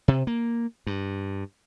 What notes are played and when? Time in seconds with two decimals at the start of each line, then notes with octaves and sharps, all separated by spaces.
0.08 C3
0.27 A#3
0.87 G2